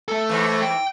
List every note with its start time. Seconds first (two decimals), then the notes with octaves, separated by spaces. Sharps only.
0.08 A3 A4
0.29 G#2 E3
0.62 G5